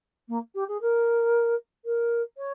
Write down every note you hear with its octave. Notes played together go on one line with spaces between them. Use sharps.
A#3
G4
G#4
A#4
A#4
C#5